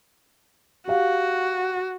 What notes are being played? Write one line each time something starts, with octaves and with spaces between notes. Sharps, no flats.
F#4 G4 F5